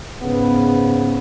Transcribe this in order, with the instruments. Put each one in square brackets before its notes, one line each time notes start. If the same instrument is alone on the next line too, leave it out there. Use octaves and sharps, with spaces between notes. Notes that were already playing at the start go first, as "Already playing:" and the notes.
[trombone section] G#2 C#3 B3